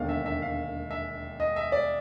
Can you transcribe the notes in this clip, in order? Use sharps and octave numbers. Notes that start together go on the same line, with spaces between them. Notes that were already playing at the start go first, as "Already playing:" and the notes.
Already playing: E1 D#2 D3 F5
E5
E5
F5
E5
D#5
E5
D5